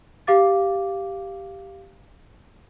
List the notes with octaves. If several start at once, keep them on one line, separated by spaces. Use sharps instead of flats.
G4 F5 D6 A6